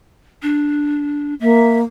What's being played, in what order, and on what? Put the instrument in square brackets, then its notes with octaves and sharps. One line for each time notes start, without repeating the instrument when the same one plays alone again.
[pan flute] D4
[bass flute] A#3 [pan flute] E5